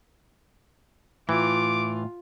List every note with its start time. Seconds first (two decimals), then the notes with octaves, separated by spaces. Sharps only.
1.29 A2 E3 F4 D6